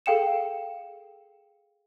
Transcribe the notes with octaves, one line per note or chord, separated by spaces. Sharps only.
G#4 A4 F5 G5 C#7 E7